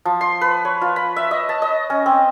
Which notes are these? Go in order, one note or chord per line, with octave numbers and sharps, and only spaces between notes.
F3
C6
B4
C#5
F4
B5
E5
D#5
A5
D#5
C#4
C4